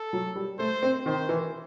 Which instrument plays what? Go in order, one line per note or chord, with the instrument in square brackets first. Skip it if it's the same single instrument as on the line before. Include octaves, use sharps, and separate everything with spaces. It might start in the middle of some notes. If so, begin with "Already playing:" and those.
Already playing: [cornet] A4
[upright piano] F#3
G3
[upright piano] A3 [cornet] C5
[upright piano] C4
[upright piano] D#3 [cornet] C5
[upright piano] E3